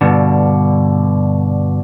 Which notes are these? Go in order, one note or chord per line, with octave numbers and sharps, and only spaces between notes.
G2 B2 D3